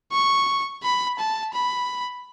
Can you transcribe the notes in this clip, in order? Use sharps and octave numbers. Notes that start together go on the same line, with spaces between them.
C#6
B5
A5
B5